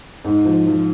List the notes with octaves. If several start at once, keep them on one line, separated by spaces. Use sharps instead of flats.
G#2
F3
F3